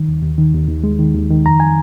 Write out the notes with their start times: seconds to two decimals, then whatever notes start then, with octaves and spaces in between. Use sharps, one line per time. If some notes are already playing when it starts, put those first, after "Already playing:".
Already playing: D#3
0.08 D#2
0.23 D#2
0.38 D#3
0.54 D#2
0.68 D#2
0.84 G#3
0.99 D#3
1.15 D#2
1.30 D#3
1.46 F2 A#5
1.60 G#5